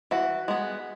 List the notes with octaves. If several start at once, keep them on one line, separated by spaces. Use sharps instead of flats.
E3 F#4
G#3 B3